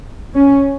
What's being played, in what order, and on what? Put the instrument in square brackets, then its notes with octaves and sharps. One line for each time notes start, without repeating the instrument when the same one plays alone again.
[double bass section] C#4